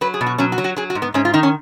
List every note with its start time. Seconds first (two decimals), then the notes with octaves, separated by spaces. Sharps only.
0.01 F#3 B4
0.14 G#4
0.21 B2
0.26 F#4
0.38 F#3 C#4
0.52 F#4
0.58 F#3
0.64 F#4
0.77 F#3 G#4
0.90 F#4
0.95 G#2
1.02 B3
1.14 G#2 C#4
1.25 F4
1.33 D#3 D#4
1.43 C#4